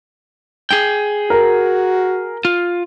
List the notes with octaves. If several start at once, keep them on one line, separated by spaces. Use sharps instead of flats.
G#4 G5
F#4 A#4
F4